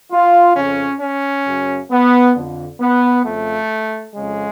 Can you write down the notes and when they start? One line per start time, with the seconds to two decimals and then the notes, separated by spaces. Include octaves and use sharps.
0.12 F4
0.56 F2 C#3 C#4
1.01 C#4
1.46 F#2 C#3
1.91 B3
2.35 F2 D3
2.81 B3
3.25 F2 C#3 A3
4.15 F2 C#3 G#3